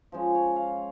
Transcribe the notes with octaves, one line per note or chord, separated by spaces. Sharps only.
F3 G#3 C#4 C5
C#5
F5